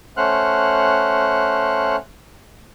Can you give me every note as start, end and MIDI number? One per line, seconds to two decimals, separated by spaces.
0.17 1.96 57
0.17 1.96 61
0.17 1.96 72
0.17 1.96 78
0.17 1.96 89
0.17 1.96 90